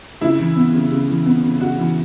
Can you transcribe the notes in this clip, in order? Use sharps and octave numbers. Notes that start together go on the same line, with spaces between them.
C#3 E4
E3
B3
C#3
C#3
E3
B3
C#3
C#3 F#4
E3